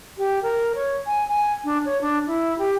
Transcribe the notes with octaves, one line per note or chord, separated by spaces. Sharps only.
G4
A#4
C#5
G#5
G#5
D4
C#5
D4
E4
G4